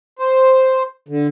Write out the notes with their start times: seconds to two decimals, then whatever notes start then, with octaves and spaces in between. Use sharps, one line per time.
0.19 C5
1.09 D3